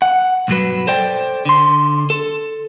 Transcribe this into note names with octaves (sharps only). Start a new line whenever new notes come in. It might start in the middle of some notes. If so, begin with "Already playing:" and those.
F#5
B1 G2 F#3 B4
A4 C5 D5 G5
D3 C6
A4